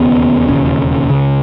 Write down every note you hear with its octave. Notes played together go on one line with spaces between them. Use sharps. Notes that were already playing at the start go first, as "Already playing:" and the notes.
Already playing: E1 D#2 C#3 B3
E1 D#2 C#3 C#4
C#2 C#3